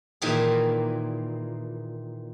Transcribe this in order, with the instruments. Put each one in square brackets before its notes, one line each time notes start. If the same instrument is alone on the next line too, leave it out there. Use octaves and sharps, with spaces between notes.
[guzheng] A#2 D#3 E3 G4 G#4